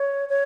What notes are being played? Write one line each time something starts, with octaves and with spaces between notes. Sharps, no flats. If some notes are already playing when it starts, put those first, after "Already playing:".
Already playing: C#5
C#5